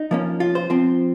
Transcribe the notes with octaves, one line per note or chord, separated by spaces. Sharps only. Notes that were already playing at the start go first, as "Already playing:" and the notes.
Already playing: D#4
F3 A#3 C#4
F4
C5
F3 C4